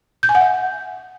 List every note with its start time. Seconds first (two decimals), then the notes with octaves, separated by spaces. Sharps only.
0.23 G6
0.29 G#5
0.35 F#5
0.41 E5